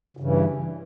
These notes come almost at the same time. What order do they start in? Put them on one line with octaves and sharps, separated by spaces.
C#3 G2 E3